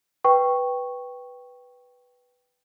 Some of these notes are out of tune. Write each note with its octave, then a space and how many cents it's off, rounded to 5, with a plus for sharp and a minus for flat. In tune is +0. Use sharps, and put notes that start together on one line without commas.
B4 +0 G5 +0 C#6 -5